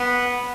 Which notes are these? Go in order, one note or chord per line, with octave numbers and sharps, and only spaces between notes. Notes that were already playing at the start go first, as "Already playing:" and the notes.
Already playing: B3